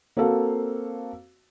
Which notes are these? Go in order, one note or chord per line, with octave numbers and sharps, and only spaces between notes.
A#3 C4 F#4 A4 F5